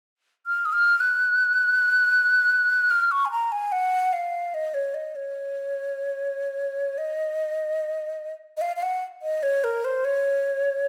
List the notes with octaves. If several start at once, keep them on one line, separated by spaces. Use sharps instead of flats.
F6
D#6
F6
F#6
F6
C#6
G#5
A#5
G#5
F#5
F5
D#5
C#5
D#5
C#5
D#5
D#5
F5
F5
F#5
D#5
C#5
A#4
C5
C#5